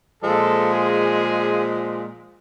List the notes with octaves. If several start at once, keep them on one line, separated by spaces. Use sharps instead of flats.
A#2 F3 G#3 A4
G#4